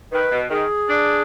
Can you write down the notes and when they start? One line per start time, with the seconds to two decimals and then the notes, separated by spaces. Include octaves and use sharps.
0.12 D#3 B4
0.31 B2
0.50 D#3 G#4
0.89 D4